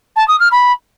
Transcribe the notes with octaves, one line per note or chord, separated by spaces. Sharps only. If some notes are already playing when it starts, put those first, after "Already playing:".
A5
D#6
F6
B5